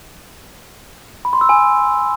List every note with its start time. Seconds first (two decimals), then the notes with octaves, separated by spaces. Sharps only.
1.25 B5
1.33 C6
1.41 E6
1.49 G#5